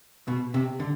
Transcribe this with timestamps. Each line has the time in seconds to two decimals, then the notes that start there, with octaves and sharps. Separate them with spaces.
0.28 B2
0.54 C3
0.80 D3